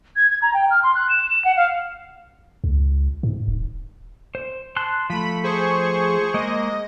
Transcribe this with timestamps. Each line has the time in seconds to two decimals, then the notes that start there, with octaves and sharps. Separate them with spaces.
0.16 G#6
0.30 G#6
0.42 A#5
0.54 G5
0.71 F6
0.83 C6
0.95 F#6
1.09 E7
1.30 E7
1.45 F#5
1.57 F5
2.64 C#2
3.23 G#2
3.48 D#1
4.35 C5
4.76 A5 C6 F#6
5.10 F3 A3 B5
5.44 G#4 C5 C#6
6.34 G#3 A#3 D#5